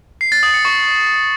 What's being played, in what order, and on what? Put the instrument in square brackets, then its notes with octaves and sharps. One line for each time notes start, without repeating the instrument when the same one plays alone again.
[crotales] C7
A6
D#6
C#7
C#6